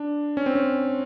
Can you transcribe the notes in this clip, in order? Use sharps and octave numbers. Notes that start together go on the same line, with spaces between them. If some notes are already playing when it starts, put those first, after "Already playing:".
Already playing: D4
C#4
C4
C#4